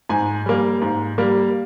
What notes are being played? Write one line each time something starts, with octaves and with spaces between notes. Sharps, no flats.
G#2 G#5
G3 A#3
G#2
G3 A#3